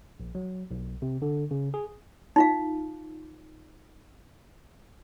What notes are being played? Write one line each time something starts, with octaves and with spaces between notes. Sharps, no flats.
A#1
F#3
B1
C3
D3
C#3
G#4
D#4 F4 F5